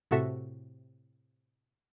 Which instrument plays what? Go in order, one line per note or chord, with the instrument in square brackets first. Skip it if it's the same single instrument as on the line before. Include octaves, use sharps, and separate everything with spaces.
[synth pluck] A2 C3 F#4 A4 E5